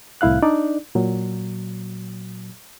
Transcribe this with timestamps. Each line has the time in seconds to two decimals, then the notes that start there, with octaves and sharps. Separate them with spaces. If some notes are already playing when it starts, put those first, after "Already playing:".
0.21 C2 A2 E4 F5 F#6
0.43 D4 D#4 D5
0.95 A#2 F#3